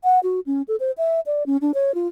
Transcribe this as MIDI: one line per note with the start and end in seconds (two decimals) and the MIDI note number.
0.04 0.19 78
0.23 0.40 66
0.46 0.62 61
0.68 0.76 69
0.80 0.91 72
0.98 1.20 76
1.26 1.43 74
1.46 1.57 61
1.61 1.72 62
1.74 1.94 73
1.95 2.08 65